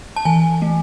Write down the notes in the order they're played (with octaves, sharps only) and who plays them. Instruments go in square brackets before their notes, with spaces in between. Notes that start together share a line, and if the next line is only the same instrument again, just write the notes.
[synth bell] A5
E3 G#5
A3